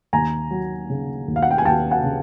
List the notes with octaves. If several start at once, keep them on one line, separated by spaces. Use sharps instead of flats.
D#2 G#5 A#5
F#3
C#3
D#2
F5
F#5
G5
G#5
D#2 G5 A5
F#5 G#5
C#3